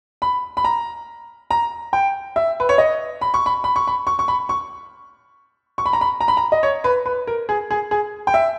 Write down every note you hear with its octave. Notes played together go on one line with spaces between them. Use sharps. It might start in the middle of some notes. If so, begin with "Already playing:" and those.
B5
B5
A#5
A#5
G5
E5
B4
C#5
D#5
B5
C#6
B5
B5
C#6
B5
C#6
C#6
B5
C#6
C#6
B5
A#5
B5
A#5
B5
A#5
D#5
C#5
B4
B4
A#4
G#4
G#4
G#4
G5
E5